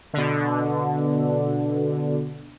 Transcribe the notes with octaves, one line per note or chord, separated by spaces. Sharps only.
B2 D3